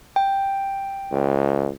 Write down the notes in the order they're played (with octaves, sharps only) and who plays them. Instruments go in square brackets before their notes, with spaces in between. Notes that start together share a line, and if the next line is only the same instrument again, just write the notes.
[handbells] G5
[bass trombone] C#2